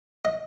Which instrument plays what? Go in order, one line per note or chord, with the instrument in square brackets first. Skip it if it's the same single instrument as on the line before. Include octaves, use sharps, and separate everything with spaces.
[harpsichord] D#5